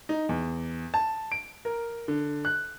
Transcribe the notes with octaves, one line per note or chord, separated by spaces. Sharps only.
D#4
E2
A5
D7
A#4
D3
F#6